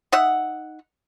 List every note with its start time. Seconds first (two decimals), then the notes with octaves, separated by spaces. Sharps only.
0.12 D#4 E5 F#5